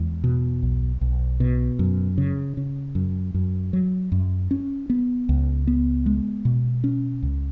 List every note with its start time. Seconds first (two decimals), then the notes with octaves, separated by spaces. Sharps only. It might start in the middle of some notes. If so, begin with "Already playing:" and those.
Already playing: E2 G#3
0.24 B2
0.63 B1
1.01 B1
1.40 B2
1.79 F#2
2.18 C#3
2.57 C#3
2.95 F#2
3.34 F#2
3.73 F#3
4.12 F#2
4.51 C#4
4.90 B3
5.29 C#2
5.67 B3
6.06 G#3
6.45 B2
6.84 C#4
7.23 C#2